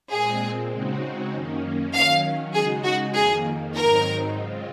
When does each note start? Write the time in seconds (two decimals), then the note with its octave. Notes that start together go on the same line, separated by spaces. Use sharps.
0.10 A#2 G#3 C4 G#4
0.72 C#3 G#3 C4 D#4 F#4
1.32 F#2 D#3 A#3 C#4
1.92 D#3 F#3 C#4 F5
2.54 C#3 G#3 D#4 F#4 G#4
2.84 F#4
3.15 F2 D#3 A#3 G#4
3.75 G#2 D#3 F#3 C4 D#4 A#4
4.36 C#3 G#3 C4 F4